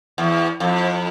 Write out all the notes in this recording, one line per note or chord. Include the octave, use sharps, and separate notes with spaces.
E2
F2